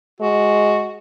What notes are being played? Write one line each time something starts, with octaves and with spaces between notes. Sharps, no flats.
G#3 F#4